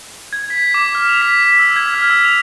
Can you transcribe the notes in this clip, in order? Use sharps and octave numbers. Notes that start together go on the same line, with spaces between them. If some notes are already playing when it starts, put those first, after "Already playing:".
G#6
B6
D6
F6
F7
B6
B6
E6
G#6
F6
E6
F7